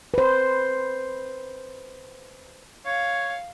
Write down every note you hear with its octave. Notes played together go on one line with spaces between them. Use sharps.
B4 C5
C#5 F5